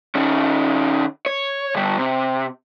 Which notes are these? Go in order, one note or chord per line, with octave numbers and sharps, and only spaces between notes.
D#3 C#4
C#5
D3 G3
C3